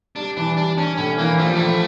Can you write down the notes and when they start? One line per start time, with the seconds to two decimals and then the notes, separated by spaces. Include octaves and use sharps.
0.16 G3 D4
0.37 E3 D4
0.57 G3 D4
0.77 C#4 D4
0.97 A2 C#4
1.18 E3 A#3
1.38 F3 A3
1.47 G3
1.55 A2 A3